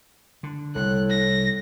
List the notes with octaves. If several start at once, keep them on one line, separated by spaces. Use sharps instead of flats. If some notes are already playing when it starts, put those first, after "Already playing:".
D3
C2 A2 F#6
A#6